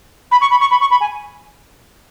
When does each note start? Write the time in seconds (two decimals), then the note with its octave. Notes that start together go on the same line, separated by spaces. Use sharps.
0.31 B5
0.41 C#6
0.51 B5
0.61 C#6
0.71 B5
0.81 C#6
0.91 B5
1.01 G#5